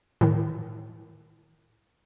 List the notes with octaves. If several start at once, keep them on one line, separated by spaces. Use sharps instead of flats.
A2 D#3